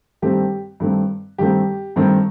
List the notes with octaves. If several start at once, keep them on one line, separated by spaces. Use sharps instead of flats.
G2 D#3 A3 C4 G4
G2 D#3 A3 C4
G2 D#3 A3 C4 G4
G2 D#3 A3 C4